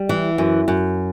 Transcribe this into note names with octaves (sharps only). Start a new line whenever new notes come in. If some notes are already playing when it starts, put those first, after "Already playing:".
Already playing: G3
E3
F#2
F#2